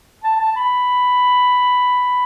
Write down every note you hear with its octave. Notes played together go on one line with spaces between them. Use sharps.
A5
A5
B5